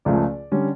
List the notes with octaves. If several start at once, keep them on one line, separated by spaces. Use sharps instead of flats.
C#2 C#3 F3 A3 D5
D3 G3 C#4